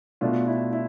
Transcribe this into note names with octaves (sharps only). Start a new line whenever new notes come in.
B2 A3 D4 F4
E4
E4